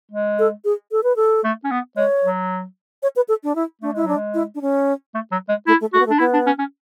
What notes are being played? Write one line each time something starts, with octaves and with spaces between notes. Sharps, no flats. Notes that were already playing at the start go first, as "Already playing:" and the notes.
G#3
A4
G#4
A4
B4
A4
A3
C#4
B3
G#3 C#5
F#3
C#5
B4
A4
D4
E4
A3 D4
G#3 E4
F#3 D4
G#3
E4
D4
C#4
A3
F#3
G#3
A3 E4
A3
A3 F#4
B3
A3
D4
B3 E4
D4
C#4
C#4